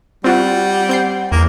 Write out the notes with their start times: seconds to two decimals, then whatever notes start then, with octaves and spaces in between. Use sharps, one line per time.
0.24 G3 C4 F4 F#4 F#5
0.89 C4 G6 C7
1.32 E2 A#3